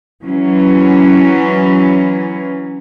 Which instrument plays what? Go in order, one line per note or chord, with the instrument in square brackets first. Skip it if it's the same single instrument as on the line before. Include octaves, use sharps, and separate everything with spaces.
[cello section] E3 F#3 C#4